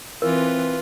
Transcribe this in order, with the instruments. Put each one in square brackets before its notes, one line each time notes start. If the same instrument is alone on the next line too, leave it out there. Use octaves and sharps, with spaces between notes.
[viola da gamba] E3 [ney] C4 [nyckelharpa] F4 B4 [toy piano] A#4